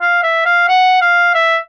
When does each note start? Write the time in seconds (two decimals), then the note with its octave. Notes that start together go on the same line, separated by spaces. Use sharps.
0.01 F5
0.23 E5
0.46 F5
0.68 F#5
1.01 F5
1.34 E5